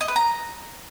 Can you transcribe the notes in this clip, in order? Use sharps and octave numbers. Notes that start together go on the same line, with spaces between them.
D#5
B4
A#5